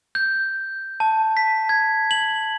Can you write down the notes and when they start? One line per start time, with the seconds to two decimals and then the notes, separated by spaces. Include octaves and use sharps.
0.15 G6
1.00 A5
1.37 B6
1.69 G#6
2.11 F#7